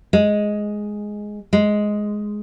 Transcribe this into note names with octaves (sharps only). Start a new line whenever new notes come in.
G#3
G#3